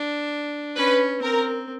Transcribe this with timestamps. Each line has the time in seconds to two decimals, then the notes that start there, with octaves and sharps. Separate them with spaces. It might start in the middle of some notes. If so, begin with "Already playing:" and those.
Already playing: D4
0.77 C#4 B4
1.22 C4 A#4